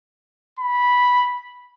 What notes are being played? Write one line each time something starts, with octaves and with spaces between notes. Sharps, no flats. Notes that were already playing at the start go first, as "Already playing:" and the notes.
B5